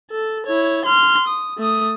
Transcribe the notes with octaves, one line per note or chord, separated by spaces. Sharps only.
A4
E4 C#5
C6 F6
D#6
A3 D#6